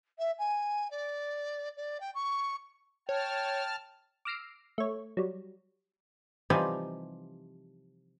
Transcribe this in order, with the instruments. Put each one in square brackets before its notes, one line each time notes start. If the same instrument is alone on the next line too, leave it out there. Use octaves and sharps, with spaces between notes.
[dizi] E5
G#5
D5
D5
G5
C#6
[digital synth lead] C#5 [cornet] G5 [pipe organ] A5 F6
[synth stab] D6 E6 F6 A#6 C7 D7
A3 C#5
F#3 G3
[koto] C3 E3 F3 G3 D#4 F4